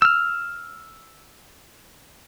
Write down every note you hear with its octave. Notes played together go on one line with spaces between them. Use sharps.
E6 F6